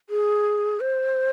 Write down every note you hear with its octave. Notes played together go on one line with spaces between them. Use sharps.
G#4
C5